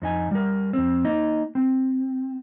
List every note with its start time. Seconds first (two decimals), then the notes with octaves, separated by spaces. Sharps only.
0.02 F2 D#4 G#5
0.31 G3 A#4
0.73 F2 C4
1.05 A#3 D#4 D#5
1.55 C4